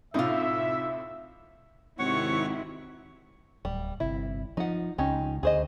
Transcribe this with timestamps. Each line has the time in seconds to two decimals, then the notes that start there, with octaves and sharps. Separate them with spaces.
0.14 A2 C3 D#4 F4 E5
1.99 G#1 C3 D#3 E4 C#5 F#5 C#6
3.65 D1 G3
4.00 G1 C3 E4
4.57 F3 D#4 F#5
4.98 C#2 C#4 D#4 G4
5.43 D2 G#4 C5 D#5